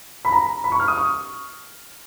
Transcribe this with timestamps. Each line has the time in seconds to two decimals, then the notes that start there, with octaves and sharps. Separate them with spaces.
0.25 B5
0.32 A#5
0.64 B5
0.72 C#6
0.80 F6
0.88 D#6
0.97 C#6